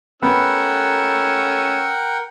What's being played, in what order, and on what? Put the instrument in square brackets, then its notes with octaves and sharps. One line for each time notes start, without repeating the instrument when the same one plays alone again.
[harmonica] A3 C#4 E6 [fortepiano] B3 [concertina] A#4 F#5 G5